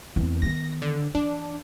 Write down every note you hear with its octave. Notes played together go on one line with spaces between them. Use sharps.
E2 C4
D#3 B3 A#6
D3
E3 D4